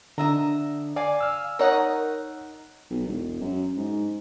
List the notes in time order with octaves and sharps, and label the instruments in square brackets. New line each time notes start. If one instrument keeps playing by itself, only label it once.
[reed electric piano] D3 D4 [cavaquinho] D#5 E5 A#5
[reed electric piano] D5 [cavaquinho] F5 G#5 D6
[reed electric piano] E6 F6
[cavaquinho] D#4 F#5 D#6 [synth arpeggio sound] A#4 C#5
[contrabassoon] B1
E1
F#2
G#2